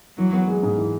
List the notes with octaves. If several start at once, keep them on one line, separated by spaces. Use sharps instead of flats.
E3 F#3
B3
G#3
G#2
E3